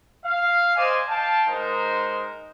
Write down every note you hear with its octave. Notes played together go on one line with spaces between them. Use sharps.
F5
C5 D5 D#5 G#5
F5 G5 A5
G#3 D#4 A#4 C5